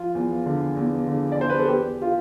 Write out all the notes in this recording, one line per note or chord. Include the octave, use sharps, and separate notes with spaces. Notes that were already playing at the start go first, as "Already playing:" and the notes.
Already playing: F3 F4
E2
D3
E2
D3
D5
E2 C5
B4
A4
E2 G4
F4